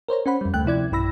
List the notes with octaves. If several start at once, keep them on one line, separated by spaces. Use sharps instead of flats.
A#4 C5 C#5 A#5
C#4 C5 F#5 B5
F2 G3
D2 A3 G5 F#6
C3 F3 E4 D5 G#6
B1 G2 E4 B5 E6 A#6